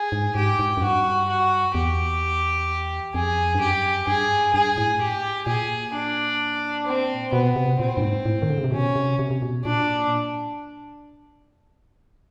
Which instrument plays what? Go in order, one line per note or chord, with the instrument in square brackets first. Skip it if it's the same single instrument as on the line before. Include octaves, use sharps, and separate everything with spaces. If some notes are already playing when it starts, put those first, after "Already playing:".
Already playing: [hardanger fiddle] G#4
[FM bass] G#2
[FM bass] G#2 [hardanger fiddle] G4
[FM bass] G#2
F#2
[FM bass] G2 [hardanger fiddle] F#4
[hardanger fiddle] F#4
[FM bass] E2 [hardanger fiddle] G4
[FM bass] F2 [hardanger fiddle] G#4
[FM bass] G2
[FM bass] F#2 [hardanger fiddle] G4
[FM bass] G2 [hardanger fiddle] G#4
[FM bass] G2 [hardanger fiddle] G#4
[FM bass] A2
[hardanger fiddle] G4
[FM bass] A#2 [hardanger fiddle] G#4
[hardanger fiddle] D4
C4
[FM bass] B2 [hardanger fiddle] B3
[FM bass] C3
[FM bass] A#2 [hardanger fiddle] C4
[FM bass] G2
G#2
A2
D#3
D3
C#3
C3
[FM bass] B2 [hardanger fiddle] C#4
[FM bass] C3
C3
C3
B2
[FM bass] A#2 [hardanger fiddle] D4